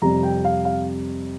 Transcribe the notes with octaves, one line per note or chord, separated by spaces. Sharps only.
F2 C3 G3 A#5
G5
F5
F5